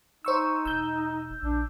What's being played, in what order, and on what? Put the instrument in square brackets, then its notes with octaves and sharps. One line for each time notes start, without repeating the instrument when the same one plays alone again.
[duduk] D#4 [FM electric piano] C5 C#6 E6
[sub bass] E1 [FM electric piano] E6 G6
[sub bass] A#1 [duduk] D4